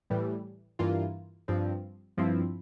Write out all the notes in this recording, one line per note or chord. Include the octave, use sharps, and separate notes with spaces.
A2 E3 G3
G2 E3 A#3 F4
G2 F3 C4
G2 F3 C4 E4